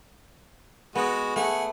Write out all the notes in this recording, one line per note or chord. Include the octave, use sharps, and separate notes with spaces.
G#3 B3 F#4
A3 G#4 F#5